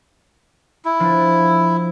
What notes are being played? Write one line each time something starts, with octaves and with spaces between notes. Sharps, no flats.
E4
F3 D4